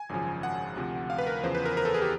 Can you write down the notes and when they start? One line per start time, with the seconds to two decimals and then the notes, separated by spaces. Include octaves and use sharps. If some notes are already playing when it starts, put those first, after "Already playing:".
Already playing: G#5
0.09 G#1 F#2 C#3 F3
0.43 F#5
0.76 D2 C3 F3
1.10 F5
1.18 B4
1.27 A#4
1.43 E2 C#3 F3 C5
1.55 B4
1.65 A#4
1.77 A#4
1.85 A4
1.94 G#4
2.02 G4